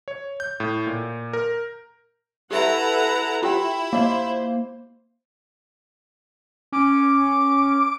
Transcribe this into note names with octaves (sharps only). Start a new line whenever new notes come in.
C#5
G6
A2
A#2
A#4
E4 G4 A4 B4 E5 F#5 A#5
E4 F4 G4 G5
A#3 C5 D#5 F5
C#4 D6